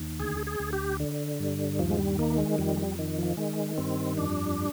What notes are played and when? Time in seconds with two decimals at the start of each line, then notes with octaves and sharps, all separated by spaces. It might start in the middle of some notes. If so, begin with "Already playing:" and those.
Already playing: D#2
0.20 D2 G#4
0.47 G#4
0.60 D2
0.73 G4
1.00 D3
1.40 G2
1.79 D#2 F3
1.90 G#3
1.99 G3
2.18 D#3 A#3
2.38 G#3
2.58 F2 G3
2.74 G#3
2.78 G3
2.99 D#3
3.18 F3
3.37 D#3 G#3
3.78 G2 C4
4.17 F2 D4